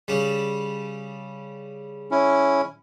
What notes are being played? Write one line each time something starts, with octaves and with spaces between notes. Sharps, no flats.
C#3 G3
C#4 E4